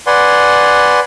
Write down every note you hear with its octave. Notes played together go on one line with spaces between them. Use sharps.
B4 D5 F#5 G#5 C6